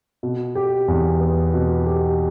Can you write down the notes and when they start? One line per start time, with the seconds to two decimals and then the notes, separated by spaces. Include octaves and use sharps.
0.23 B2
0.55 G4
0.88 E2
1.21 B3
1.54 B2
1.86 G4